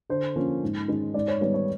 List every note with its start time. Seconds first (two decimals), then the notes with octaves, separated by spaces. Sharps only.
0.09 D3 C5
0.36 F3 A#3 C#4
0.62 G#2
0.88 D#3 G#3 C#4
1.14 G#2 D5
1.28 C#5
1.41 D#3 G3 B3 C#5
1.54 C#5